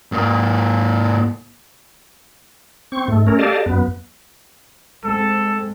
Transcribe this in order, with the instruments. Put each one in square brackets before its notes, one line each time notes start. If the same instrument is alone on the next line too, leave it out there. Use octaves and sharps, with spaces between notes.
[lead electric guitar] G#2 A#3
[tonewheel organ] C4 C#6
G#2 A3
A3 C#4 A#4
G4 A4 D5 D#5 F5 A5
F#2 B3
[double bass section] G#3 C4 [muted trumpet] A4